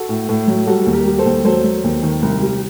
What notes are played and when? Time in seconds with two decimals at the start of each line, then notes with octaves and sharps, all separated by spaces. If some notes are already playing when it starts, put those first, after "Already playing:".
Already playing: F#4 A4
0.09 A2
0.29 A2
0.48 F#3
0.67 G3 F#4 A4
0.86 D#2
0.93 G4 A#4
1.06 G3
1.18 A4 C5
1.26 D#2
1.45 F#3 A4 C5
1.64 F#3
1.84 D#2
2.03 D#3
2.22 C2
2.42 G3